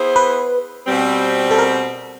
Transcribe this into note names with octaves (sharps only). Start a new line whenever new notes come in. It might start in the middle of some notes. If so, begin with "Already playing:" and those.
Already playing: B3 E4 G#4 C5
B4
B2 G3 C4
A4
A#4